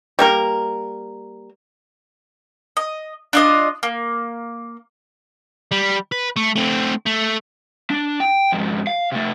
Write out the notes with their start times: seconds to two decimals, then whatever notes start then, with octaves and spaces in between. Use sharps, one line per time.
0.19 G3 A#3 A#4
2.77 D#5
3.33 D4 F4 D#5
3.83 A#3
5.71 G3
6.12 B4
6.36 A3
6.56 A3 C4
7.06 A3
7.90 D4
8.20 G5
8.52 F2 G#2
8.87 F5
9.12 C3 A3